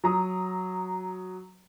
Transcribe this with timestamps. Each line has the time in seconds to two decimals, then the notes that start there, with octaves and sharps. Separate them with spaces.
0.04 F#3 A#5 D#6